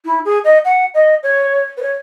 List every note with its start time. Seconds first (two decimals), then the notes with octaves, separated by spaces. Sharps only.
0.05 E4
0.25 G#4
0.44 D#5
0.64 F#5
0.94 D#5
1.23 C#5
1.77 B4
1.82 C#5